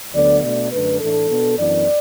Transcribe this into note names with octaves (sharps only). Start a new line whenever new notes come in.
D2 D3 F#3 B3 D5
B2 A3 D4 D5
F#2 D3 A3 D4 B4
A2 E3 A3 D4 A4
B2 B3 D4
F#2 E3 B3 D4 D5